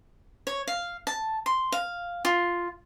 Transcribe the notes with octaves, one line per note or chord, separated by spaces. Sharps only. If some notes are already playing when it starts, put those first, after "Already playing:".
C#5
F5
A5
C6
F5
F4